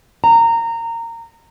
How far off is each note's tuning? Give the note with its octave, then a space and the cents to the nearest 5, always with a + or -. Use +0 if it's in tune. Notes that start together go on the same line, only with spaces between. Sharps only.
A#5 -20